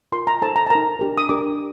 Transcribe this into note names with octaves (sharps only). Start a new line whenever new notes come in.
F4 A#4 C6
A#5
D#4 A4 C5 A5
A#5
A5
D#4 A#4 A#5
D4 G4 A#4
D#6
D4 G4 A#4 D6